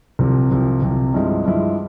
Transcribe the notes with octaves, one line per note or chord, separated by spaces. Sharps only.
C2 C3 F3
C2 C3 F3
C2 C3 F3
G2 F3 G#3 E4
G2 F3 G#3 E4